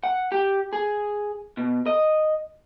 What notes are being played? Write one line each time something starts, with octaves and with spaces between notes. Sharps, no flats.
F#5
G4
G#4
B2
D#5